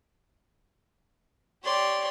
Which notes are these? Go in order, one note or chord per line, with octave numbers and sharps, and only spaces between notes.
G4 C#5 D5 C6